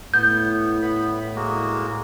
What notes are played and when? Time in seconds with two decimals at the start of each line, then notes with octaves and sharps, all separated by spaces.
0.14 A2 B3 G6
0.82 B3 B5
1.36 G#3 A#3 F#4